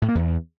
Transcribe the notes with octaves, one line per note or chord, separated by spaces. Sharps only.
A2
A#3
E2